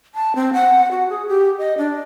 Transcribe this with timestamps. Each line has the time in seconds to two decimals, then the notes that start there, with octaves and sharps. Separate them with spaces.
0.15 A5
0.35 C4
0.53 F#5
0.91 F#4
1.09 G#4
1.28 G4
1.59 D#5
1.78 D4